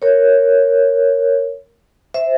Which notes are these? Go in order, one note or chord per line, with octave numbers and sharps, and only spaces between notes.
A#4 C#5
C5 E5